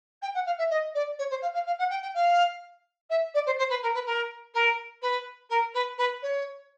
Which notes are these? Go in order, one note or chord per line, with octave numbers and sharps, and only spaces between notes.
G5
F#5
F5
E5
D#5
D5
C#5
C5
F5
F5
F5
F#5
G5
G5
F5
E5
D5
C5
C5
B4
A#4
B4
A#4
A#4
B4
A#4
B4
B4
C#5